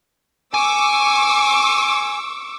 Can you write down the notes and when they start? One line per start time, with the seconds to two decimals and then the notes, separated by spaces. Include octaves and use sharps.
0.54 G#5 C#6 D6 E6